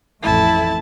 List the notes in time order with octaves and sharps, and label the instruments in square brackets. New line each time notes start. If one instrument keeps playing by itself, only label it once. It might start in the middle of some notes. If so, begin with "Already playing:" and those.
[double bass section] A1 F2 A3 [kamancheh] E4 A5